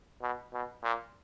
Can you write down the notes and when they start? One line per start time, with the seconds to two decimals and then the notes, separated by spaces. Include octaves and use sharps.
0.22 B2
0.53 B2
0.83 A#2